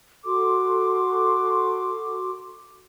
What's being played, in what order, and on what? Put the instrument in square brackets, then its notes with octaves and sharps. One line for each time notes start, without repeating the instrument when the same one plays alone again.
[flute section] F#4 A4 C6 D6